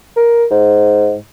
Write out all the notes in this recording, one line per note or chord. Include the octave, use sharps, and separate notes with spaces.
A#4
G#2